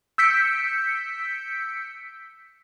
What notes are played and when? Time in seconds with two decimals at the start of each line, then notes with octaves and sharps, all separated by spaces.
0.18 E6 G6 B6 C#7 D7